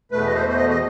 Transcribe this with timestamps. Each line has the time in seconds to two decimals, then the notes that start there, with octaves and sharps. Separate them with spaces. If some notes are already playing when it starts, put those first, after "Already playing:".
0.11 E2 B2 A3 B4
0.27 D#5
0.34 C5
0.49 C5
0.55 D#5
0.70 D#5